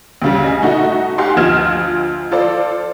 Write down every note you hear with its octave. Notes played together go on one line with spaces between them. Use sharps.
D2 C#3 G3
D#5 G#5
A3 D#4 F#4 D#5
G4 F5 F#5 G#5 C6
D2 F3 D#5 F6 G#6 E7
F4 A4 C5 D5